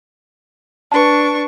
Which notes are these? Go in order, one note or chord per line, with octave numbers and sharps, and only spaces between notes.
D4 B4 A5 C#6